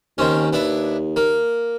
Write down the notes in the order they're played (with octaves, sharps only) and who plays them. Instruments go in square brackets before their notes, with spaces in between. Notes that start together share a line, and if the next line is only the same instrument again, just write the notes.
[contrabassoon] D#2 [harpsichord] D#3 C4 C#4
[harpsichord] B3 D4 E4
A#3